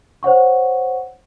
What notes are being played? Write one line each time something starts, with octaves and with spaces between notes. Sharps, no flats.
C5 C#5 F#5 C#6